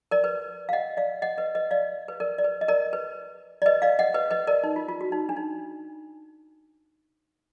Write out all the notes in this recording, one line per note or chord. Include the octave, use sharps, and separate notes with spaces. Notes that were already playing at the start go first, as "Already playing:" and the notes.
A#4 D5
B4
F5
D#5 F#5
D5 F5
D#5 F#5
B4 D#5
B4 D#5
D5 F5
B4
A#4 D5
D5
B4
D#5
A#4 D5
B4
D5
B4 D#5
D5 F5
D#5 F#5
B4 D#5
B4 D#5
A#4 D5
D#4
F4
F4
F#4
D#4
D4
D#4